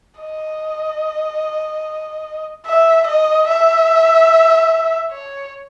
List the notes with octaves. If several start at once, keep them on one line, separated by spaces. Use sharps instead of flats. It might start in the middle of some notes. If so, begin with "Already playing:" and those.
D#5
E5
D#5
E5
C#5